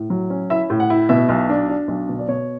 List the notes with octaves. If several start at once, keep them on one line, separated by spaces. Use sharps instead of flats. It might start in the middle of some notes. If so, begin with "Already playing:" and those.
Already playing: A2
F#3
C#4
E4 E5
A2
F#5
E4
B2 E5
B1
D4
D4
B1
B2
D5
B2 C#5